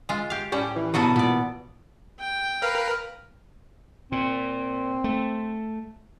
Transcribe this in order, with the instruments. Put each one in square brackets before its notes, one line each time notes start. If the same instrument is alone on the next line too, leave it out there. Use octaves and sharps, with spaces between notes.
[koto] G#3 F4
G4 F5
[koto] A2 G3 C#4 [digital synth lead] G4
[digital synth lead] E3
[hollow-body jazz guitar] B2 E3 [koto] F#3 F#4 A4 [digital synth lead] D#6
[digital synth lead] A#2 [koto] B3 D5
[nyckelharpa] G5
[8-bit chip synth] A#4 B4 [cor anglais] F5
[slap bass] A#2 [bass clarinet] C4
[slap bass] A3